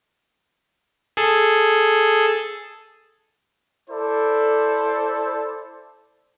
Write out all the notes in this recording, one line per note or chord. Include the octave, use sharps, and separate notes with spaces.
G#4 A4
E4 A4 C5 D5